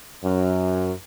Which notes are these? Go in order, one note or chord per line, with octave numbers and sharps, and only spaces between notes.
F#2